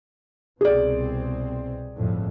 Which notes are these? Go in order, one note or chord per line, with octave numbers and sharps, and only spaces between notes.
C2 B2 C4 G#4 D5
G1 F2 A2